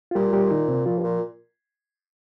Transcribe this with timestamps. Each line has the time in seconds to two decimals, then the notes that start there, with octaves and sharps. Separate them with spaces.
0.11 F4
0.15 A#2 G3 G4
0.33 G3 G4
0.51 D#3 D#4
0.68 C3 C4
0.86 A#2 F3 F4
0.98 G2
1.03 A#2